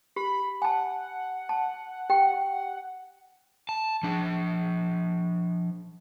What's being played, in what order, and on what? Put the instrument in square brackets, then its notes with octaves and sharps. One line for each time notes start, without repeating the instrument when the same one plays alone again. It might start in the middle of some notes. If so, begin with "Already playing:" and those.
[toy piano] G4 [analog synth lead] B5
[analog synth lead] F#5 [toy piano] G#5 A5
[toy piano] A5
G4 G5
[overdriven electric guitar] A5
F3 D4